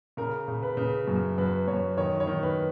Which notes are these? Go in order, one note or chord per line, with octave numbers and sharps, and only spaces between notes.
C#3 A#4
C#3
B4
C#3
F#2
F#2 B4
F#2 C#5
D#3 C#5
C#5
D#3
B4